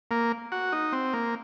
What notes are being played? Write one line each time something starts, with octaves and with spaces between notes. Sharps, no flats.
A#3
F#4
D#4
C4
A#3